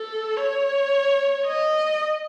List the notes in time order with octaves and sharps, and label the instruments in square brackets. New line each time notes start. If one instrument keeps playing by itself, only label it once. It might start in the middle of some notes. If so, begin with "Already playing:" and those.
Already playing: [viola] A4
C#5
D#5